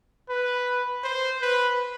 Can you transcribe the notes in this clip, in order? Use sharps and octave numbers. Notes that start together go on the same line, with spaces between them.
B4
C5
B4